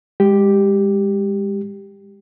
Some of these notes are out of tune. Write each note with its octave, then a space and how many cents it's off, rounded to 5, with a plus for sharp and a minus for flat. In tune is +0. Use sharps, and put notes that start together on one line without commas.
G#3 -35 G4 +0